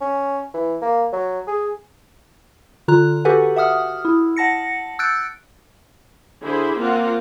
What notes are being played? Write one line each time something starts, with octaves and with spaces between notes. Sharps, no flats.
C#4
E3
A#3
F#3
G#4
D3 F4 A#5 F#6
F#4 G4 A4 B4 F#5 G#5
E5 F#5 D#6 F6
E4
F#5 A5 A#6 C#7
E6 F#6 G6 A6 C#7 D7
D3 E4 G#4 C5 B5
A#3 C4 F4 A#4 F#5